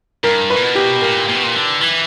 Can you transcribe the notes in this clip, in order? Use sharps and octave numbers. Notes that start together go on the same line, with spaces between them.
G2 A#4
B4
A#2
B2
G4
A#2 A#4
A#2
B2
A#2
D3
E3